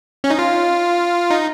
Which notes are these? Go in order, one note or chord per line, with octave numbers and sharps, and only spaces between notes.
C#4
D#4
F4
D#4